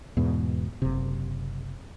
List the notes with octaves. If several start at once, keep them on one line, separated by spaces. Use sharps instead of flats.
E2 G#2 B2
F#1 C3